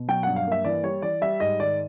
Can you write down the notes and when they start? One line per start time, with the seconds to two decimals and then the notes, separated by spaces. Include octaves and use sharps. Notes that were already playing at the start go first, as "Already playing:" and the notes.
Already playing: B2
0.08 F#3 G5
0.23 G2 F#5
0.36 F5
0.47 A#3 E5
0.64 E3 D5
0.83 G3 C#5
1.02 E3 D5
1.21 G3 E5
1.40 G#2 D#5
1.59 D#3 D5